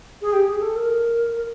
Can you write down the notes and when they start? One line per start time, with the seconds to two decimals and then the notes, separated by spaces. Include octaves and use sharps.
0.22 G#4
0.33 G4
0.47 G#4
0.61 A4
0.76 A#4